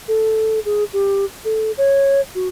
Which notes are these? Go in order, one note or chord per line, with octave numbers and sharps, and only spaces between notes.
A4
G#4
G4
A4
C#5
F#4